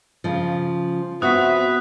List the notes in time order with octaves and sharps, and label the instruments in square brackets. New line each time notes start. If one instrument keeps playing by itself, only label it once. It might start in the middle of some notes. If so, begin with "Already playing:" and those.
[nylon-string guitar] C#3 F3
[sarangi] B3 [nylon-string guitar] C4 F#4 [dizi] E5 [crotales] D#6 F#6